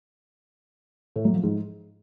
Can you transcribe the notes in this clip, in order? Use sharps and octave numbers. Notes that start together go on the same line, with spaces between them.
A2
F#3
F3
G#2